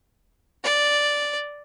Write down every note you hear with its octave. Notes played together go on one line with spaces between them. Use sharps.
D5